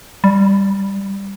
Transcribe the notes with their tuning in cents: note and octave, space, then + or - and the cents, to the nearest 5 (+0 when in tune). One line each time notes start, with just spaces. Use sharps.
G3 +5